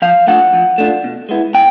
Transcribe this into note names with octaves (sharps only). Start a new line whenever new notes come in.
F3 F5
A3 D4 F4 F#5
F3
A3 D4 F4
B2
G#3 B3 E4
B2 G5